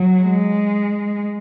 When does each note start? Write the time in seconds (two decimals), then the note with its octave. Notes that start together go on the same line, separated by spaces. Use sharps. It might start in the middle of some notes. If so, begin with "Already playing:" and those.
Already playing: F#3
0.23 G#3